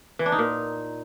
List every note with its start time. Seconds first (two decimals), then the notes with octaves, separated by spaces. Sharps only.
0.19 E3
0.26 D4
0.32 D#4
0.39 A#2